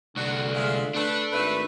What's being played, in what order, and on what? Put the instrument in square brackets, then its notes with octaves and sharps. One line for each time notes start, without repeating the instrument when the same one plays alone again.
[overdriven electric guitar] C2 D4 [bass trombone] D3 [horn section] F#4
[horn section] G#3 F4 E5
[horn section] A3 A4 B4 [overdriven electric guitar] D4
[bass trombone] G#1 [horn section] A3 B4 E5